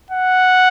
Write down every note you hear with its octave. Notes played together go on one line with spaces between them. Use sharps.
F#5